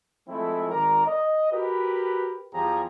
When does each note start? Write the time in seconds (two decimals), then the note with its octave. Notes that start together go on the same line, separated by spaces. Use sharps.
0.28 F3 G#3 A3 C4 E4
0.70 G#1 A#4 D5 A#5
1.07 D#5
1.52 F#4 G4 A#4 B4
2.54 E2 F3 G3 G4 G#4 A#5